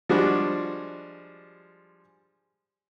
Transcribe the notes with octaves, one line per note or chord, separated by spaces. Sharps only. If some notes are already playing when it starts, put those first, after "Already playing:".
F3 G3 G#3 D4 F#4